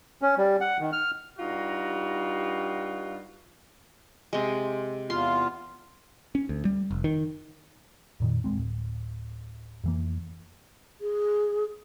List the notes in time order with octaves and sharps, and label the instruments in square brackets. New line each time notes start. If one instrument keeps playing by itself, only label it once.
[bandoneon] C#4
G3
F#5
D#3
F6
[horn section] G2 G3 D#4 F4 F#4
[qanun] C3 G#3
[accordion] E2 F4 [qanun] C6
[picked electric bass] C#4
D2
G3
F1
D#3
F2 A#2 D#3
D#1 G#1 G#3 C4
D1
F2 E3 A#3
[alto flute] G#4